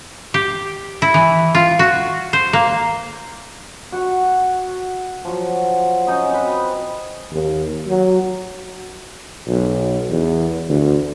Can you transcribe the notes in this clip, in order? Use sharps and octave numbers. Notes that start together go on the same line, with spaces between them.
G4
E4
E3
F4
F#4
C5
A#3
F#4 C#6
F3 F#3
C#4 D#4 D#5
C4 B4
D#2
F#3
B1
E2
D2